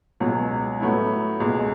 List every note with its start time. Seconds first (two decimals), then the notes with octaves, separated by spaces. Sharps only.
0.20 C#2 B2 F#3
0.80 A2 F#3 B3 E4
1.40 C#2 B2 G#3